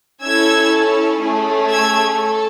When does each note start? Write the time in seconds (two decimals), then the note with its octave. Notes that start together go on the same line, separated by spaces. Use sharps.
0.22 C#4 E4 A4 E6 G#6
1.21 A3 C#4 G#4
1.69 E6 G#6
2.18 A4